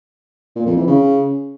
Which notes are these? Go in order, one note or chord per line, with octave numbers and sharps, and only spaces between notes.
A#2
F2
E3
C#3